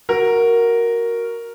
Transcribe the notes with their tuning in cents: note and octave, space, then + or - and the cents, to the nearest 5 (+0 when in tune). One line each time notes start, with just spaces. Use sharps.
F#4 +0 A#4 +0